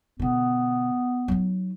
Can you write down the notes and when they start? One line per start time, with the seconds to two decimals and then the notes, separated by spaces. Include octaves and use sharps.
0.19 B2 D3 B3
1.28 F#3 D#4